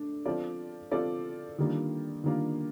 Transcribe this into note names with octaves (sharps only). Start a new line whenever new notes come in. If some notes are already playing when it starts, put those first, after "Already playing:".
Already playing: A3 D4
F3 C4 F4 A4 D5
F3 C4 F4 A4 D5
D#3 G3 A#3 D4 F4
D#3 G3 A#3 D4 F4